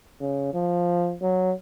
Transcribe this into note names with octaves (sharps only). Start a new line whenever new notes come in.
C#3
F3
F#3